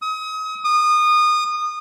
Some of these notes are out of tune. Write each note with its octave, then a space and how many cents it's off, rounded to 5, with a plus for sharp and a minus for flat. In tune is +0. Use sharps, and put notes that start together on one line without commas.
D#6 +35
D#6 -25